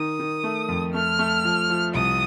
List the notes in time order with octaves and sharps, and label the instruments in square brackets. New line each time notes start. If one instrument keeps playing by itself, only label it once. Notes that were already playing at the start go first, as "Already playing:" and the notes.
Already playing: [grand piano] D#3 [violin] D#6
[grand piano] D#3
A3
F2
[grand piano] A3 [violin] F6
[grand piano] A3
F3
F3
[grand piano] C2 [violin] D#6